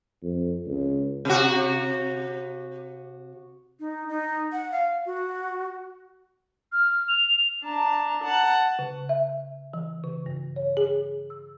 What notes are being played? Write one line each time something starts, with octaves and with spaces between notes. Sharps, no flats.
F2
C#2
C3 F#4
D#4
D#4
F#5
F5
F#4
F6
F7
D4 A5 A#5
F#5 A5
C#3
E5
E3
C#3
G2
C#5
G#4
E6